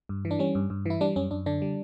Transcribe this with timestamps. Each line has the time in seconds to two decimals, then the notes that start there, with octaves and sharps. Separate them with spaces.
0.09 G2
0.25 E3
0.31 D4
0.39 G3 C#4
0.55 G2
0.70 G2
0.86 E3 E4
1.01 G3 D4
1.16 F#2 C#4
1.31 F#2 D4
1.46 D3 D4
1.62 G3